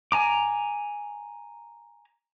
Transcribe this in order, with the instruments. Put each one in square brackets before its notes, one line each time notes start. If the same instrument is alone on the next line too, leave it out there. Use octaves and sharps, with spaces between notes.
[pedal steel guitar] G#5 A#5 D6